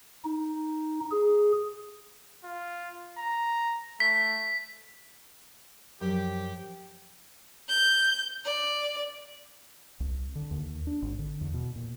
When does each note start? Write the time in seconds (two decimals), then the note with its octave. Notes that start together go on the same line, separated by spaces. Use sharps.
0.25 D#4
1.12 G#4
2.44 F4
3.18 A#5
4.00 A3 B6
6.01 F#2 F3 G4
7.69 G6
8.45 D5
10.00 C2
10.35 D3
10.51 D#2
10.87 D4
11.02 G#1
11.19 D3
11.41 E2
11.54 B2
11.76 A#2